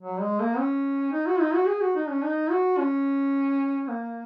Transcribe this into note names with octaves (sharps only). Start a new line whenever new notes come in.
F#3
G#3
A#3
C#4
D#4
F#4
D#4
F#4
G#4
F#4
D#4
C#4
D#4
F#4
C#4
A#3